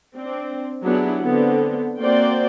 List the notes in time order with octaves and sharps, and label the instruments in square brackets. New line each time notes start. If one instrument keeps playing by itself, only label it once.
[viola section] C4 D4
F#3 B3 D4 E4 G4 G#4
D3 B3 C4
A#3 C4 F#4 C5 D5 G5